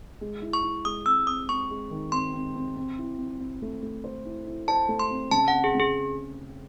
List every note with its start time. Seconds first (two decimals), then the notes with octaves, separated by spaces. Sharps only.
0.21 G#3
0.42 E4
0.53 C#6
0.63 E4
0.85 G#3 D#6
1.06 C4 E6
1.27 C4 D#6
1.49 C4 C#6
1.71 G#3
1.91 D#3
2.12 C4 C6
2.34 C4
2.55 C4
2.76 C4
2.98 E4
3.18 C4
3.40 C4
3.62 A3
3.82 A3
4.04 C5
4.25 E4
4.47 E4
4.68 C5 A5
4.88 A3
4.99 C6
5.10 C4
5.31 C#3 A5
5.48 C4 F#5
5.64 G#4
5.75 C#3 G#4